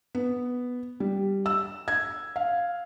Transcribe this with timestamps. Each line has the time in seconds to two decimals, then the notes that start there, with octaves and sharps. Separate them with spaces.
0.15 B3
1.00 G3
1.46 E6
1.88 G#6
2.36 F5